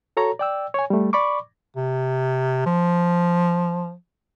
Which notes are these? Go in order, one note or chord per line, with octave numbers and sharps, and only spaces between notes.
F#4 A4 C#5 A#5
D5 G5 E6
C#5 G#5
G3 A3
D5 B5 C#6 D6
C3
F3